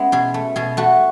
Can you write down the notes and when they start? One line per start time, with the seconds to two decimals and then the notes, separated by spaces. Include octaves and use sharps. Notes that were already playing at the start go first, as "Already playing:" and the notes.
Already playing: G#3 B3 C#4 E4
0.12 B2 G#4
0.34 A3
0.56 B2 G#4
0.77 A3 F#4